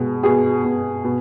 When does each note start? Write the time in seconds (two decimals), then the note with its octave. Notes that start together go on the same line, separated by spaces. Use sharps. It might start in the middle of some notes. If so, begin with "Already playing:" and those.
Already playing: B2 G#3
0.23 B2 G#4
0.65 B2
1.05 B2